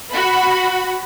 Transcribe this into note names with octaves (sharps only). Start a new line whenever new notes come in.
F#4 B5